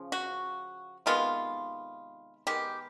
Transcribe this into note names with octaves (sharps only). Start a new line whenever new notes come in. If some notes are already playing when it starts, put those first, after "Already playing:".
Already playing: C#3 F3
F#4
C3 D#3 G#3 B3 F4
D#3 G#3 B3 G4